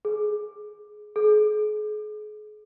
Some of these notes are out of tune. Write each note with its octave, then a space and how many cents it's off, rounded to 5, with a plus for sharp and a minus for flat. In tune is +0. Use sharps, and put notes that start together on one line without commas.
G#4 +15
G#4 +35